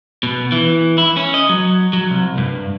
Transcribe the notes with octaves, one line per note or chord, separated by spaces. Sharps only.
B2
E3
E4
C#4
D#5
F#3
F#3
C2
G2